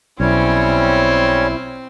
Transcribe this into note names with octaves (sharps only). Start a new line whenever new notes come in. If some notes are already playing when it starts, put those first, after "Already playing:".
B1 G3 C4 C#4 E4 C#5